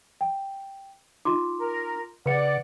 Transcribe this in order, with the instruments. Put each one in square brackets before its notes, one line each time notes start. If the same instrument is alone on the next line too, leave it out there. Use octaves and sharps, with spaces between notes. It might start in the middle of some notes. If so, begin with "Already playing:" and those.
[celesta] G5
[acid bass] D#4 [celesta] F4 C6 D6
[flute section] A#4
[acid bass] C#3 [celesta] B4 C#7 [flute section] D5 F#5